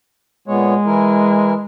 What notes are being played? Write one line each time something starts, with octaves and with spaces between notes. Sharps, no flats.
A#2 G#3 B3 C#5
E3 E4 A#4